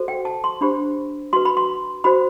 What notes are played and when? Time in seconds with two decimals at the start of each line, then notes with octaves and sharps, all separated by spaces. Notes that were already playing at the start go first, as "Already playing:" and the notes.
Already playing: F#4 A4 C5
0.08 G5
0.25 A5
0.44 C6
0.61 D4 G4 C5 B5
1.33 F#4 B4 C6
1.45 B5
1.57 C6
2.04 F#4 C5 B5